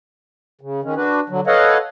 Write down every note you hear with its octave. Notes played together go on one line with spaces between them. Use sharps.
C#3
D#3 G#3 C#4
D4 F#4 B4
D3 F#3
A4 B4 C#5 D#5 F5 F#5